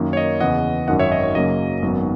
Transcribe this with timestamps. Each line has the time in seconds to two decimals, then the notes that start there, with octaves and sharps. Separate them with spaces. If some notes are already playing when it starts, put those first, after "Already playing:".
Already playing: F#2 D#3 A#3
0.13 C#5
0.17 D#5
0.40 E2 C#3 E3 D#5 F#5
0.88 G#1 F#2 D#3 D#5 F#5
0.99 C#5 E5
1.12 D#5
1.23 C#5
1.35 F#2 C#3 F#3 A#3 D#5
1.82 G#1 F#2 D#3 F#3 B3